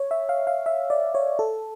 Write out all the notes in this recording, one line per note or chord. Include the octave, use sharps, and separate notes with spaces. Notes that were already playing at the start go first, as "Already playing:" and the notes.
Already playing: C#5
E5
F5
F5
E5
D5
C#5
A4